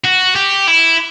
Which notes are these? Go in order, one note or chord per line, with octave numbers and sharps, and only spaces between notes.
F#4
G4
E4